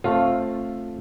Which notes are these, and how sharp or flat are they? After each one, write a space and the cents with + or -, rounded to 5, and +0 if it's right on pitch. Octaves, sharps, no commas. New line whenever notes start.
A3 +0 C4 +25 F4 +0